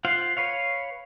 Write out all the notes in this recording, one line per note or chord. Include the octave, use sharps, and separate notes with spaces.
F4 C5 F5 F#5
B4 C#5 F5